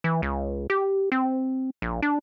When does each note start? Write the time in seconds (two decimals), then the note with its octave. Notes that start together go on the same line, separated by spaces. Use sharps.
0.04 E3
0.22 C#2
0.70 G4
1.12 C4
1.82 A#1
2.02 D4